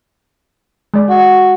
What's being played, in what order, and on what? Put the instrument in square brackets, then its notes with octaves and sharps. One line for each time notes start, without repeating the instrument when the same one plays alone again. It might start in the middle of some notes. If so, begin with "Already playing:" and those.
[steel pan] G#3 D5
[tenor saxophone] F#4